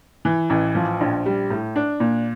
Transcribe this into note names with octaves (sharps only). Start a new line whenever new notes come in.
E3
A1
F3
A#1
G3
A2
D4
A#2